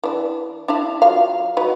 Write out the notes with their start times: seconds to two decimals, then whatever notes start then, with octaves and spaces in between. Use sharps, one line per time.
0.04 E3 D4
0.68 D4 E4 F5
1.02 F#3 F4 F5
1.57 F#3 D#4 B4